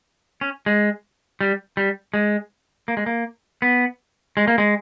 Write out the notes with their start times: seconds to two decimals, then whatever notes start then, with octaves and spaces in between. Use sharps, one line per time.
0.41 C#4
0.66 G#3
1.41 G3
1.77 G3
2.14 G#3
2.88 A#3
2.97 G#3
3.06 A#3
3.62 B3
4.37 G#3
4.48 A#3
4.58 G#3